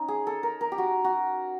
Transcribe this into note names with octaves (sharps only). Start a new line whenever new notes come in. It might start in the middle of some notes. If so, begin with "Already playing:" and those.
Already playing: C#4 D#4
G#4
A4
A#4
A#4
G4
F#4
F#4